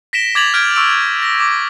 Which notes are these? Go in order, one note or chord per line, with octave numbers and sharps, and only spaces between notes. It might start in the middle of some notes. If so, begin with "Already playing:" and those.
A#6 B6 D7 E7 G7
D6 G#6 A6 F7 F#7
F6 G6 G#6 D7
C#6 E6 D7
A#6
D6